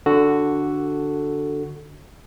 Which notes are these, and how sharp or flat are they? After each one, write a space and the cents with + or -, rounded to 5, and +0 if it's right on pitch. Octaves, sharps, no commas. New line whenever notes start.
D3 +0 F#4 +0 A4 +5